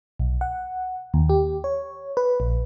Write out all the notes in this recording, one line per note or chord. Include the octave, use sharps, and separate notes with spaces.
B1
F#5
D#2
G4
C#5
B4
A#1